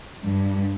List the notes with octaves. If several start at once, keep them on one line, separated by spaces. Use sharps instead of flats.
G2